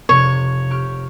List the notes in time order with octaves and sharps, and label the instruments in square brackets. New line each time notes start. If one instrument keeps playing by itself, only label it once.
[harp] F1 C3 [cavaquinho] C#5
[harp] G4 C#6 F6